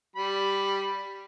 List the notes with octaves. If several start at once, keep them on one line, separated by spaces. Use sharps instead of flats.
G3 B5